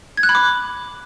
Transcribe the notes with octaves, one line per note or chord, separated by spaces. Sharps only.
G#6
F#6
B5
D6